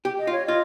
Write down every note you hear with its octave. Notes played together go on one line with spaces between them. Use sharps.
G4
D#5
F4
C#5
F4 D#5